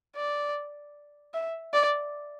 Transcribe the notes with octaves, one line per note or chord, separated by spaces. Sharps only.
D5
E5
D5